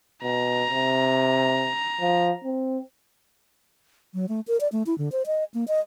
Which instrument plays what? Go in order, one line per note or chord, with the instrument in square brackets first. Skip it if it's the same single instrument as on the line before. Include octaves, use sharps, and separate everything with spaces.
[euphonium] B2 [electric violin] A#5
[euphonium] C3
F3
C4
[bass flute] F#3
A3
A#4
D5
A3
E4
D3
C5
D#5
A#3
D#5